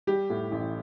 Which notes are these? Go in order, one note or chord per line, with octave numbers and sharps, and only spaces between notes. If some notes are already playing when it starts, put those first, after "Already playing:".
G3 G4
A2
A1